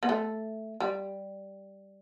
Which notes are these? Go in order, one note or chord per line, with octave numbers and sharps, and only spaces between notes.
B3
A3
G3